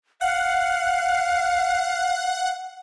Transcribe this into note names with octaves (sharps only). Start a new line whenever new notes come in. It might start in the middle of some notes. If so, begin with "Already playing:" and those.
F5 F#5